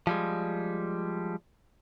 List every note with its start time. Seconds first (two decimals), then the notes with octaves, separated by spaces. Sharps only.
0.07 F3 G3 G#3